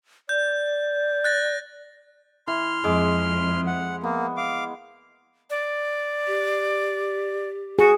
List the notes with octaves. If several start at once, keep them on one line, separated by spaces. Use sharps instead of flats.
D5 G6
F#6 A6 A#6
E3 C6 F6
F2 G#3 D6
F#5
A#3 B3
F5 D6
D5
G4
F#4 G#4